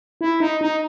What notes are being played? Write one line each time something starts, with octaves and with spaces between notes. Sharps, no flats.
E4
D#4
D#4